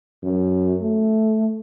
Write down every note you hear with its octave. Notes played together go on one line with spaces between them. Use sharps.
F#2
A3